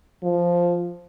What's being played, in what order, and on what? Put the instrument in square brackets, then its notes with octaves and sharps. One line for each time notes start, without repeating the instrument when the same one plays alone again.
[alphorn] F3